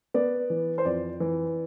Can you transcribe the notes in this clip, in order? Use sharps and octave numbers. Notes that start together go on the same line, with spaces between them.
B3 D5
E3
C5
F2 D5
E3